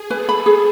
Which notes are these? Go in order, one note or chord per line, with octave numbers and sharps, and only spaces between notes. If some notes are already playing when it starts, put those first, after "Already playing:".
Already playing: G#4
A4 B4
B5
G#4